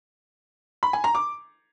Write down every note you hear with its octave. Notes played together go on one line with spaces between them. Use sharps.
B5
G#5
A#5
D6